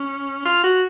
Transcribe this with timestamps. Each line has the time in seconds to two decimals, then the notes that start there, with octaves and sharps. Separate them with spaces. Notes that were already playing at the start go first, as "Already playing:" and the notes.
Already playing: C#4
0.45 F4
0.64 F#4